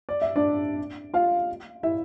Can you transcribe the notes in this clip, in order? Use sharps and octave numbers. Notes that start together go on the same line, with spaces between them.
D5
E5
D4 D5
F4 F5
E4 E5